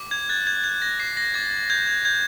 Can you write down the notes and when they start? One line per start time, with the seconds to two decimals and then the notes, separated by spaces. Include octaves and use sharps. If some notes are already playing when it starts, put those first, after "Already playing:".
Already playing: D6
0.11 G#6
0.29 F#6 A6
0.47 G#6
0.64 F#6 G#6
0.82 A#6
1.00 D6 C7
1.17 A#6
1.34 D6 A6
1.70 G6 G#6
1.88 G#6
2.05 G6 G#6